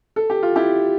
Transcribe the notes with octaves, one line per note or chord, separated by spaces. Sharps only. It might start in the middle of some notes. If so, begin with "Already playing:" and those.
A4
G4
F4
E4 G4